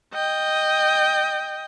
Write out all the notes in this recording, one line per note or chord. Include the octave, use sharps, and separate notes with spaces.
D#5 G5